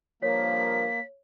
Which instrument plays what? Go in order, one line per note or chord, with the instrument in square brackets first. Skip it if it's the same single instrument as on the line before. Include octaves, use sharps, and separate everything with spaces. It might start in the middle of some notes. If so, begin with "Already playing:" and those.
[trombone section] G2 F3 A#4 [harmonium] A#3 [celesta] C#5 [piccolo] B6